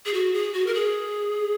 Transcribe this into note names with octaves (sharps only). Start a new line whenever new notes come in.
G#4
F#4
G#4
F#4
A#4
G#4